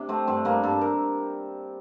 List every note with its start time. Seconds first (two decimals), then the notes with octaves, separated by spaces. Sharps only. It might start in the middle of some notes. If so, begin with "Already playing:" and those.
Already playing: C3 D4
0.09 A3 C4
0.27 G2 C4
0.45 G2 A#3
0.63 G2 A4
0.81 A#4